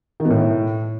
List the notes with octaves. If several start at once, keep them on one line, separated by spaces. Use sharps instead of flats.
D#3
B2
A2